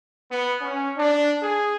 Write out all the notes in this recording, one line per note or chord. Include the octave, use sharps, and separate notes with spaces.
B3
C#4
D4
G#4